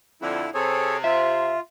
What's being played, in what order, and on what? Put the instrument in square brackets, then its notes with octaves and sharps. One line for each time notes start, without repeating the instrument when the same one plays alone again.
[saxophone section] F2 D3 [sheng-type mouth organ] E4
[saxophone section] C3 C4 [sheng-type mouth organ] G#4 A4 C#5
[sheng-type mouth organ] F4 [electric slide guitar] E5